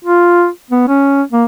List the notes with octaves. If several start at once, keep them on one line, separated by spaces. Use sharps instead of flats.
F4
B3
C#4
A#3